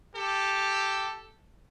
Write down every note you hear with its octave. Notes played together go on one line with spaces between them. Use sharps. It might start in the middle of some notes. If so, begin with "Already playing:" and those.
G4 A4